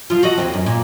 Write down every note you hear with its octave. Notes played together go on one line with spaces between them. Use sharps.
F3 F4
F#4 A4 D#5
D#2 C4
F#2
A#2